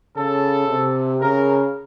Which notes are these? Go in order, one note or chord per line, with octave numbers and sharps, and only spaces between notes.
C#3 A4
C3
C#3 A#4